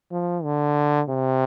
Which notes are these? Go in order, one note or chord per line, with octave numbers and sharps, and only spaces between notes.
F3
D3
C3